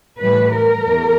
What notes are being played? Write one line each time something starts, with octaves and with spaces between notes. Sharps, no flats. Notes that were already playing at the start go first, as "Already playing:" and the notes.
A2 E3 G3 B4
A#4
E2